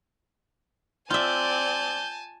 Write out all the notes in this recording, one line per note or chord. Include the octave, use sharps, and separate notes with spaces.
C4 F4 D5 E5 G#5 A5 G6